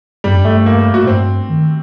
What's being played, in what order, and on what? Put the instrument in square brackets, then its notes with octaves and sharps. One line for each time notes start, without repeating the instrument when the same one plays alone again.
[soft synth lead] G2 [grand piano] G3
[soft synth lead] F#2
[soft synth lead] G2 [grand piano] A3
[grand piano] A#3
A#3
F#4
[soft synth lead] A2
[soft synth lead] G2 [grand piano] C4
[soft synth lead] D#3